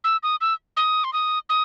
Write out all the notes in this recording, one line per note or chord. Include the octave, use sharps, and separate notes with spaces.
E6
D#6
E6
D#6
C6
D#6
D#6